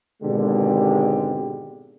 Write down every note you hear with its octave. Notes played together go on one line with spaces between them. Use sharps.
G#1 B2 D3 G#3 G4